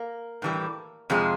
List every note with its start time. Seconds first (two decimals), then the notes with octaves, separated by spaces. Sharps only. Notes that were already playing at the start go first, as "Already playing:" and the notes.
Already playing: A#3
0.42 A2 E3 G3
1.10 F2 C3 F3 G#3